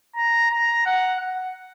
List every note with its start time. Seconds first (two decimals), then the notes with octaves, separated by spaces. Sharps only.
0.16 A#5
0.51 A#5
0.86 F#5
1.21 F#5